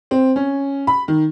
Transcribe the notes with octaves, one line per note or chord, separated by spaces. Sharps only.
C4
C#4
B5
D#3